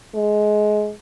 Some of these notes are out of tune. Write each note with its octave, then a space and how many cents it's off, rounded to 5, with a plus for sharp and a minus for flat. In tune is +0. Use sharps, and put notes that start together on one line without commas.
G#3 +20